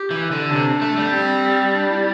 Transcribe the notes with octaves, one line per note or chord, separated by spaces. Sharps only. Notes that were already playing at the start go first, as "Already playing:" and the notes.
Already playing: G4
E3
D3
C3 D4
A3
G3
C4
D4
E4